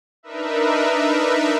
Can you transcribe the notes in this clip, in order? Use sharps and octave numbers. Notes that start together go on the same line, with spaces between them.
D4 D#4 A#4 B4 E5